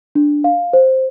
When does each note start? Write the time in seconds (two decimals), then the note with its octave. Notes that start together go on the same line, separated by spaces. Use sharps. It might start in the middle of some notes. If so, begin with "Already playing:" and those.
0.15 D4
0.44 F5
0.73 C5